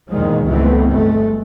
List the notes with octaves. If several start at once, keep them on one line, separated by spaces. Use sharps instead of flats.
E2 A#2 D#3 F3 G#3
C#2 G2 E3 A3 B3 C4
G1 G#3 A3